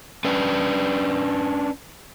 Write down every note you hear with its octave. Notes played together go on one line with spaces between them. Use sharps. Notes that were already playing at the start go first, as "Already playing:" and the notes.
C#4 D4 B4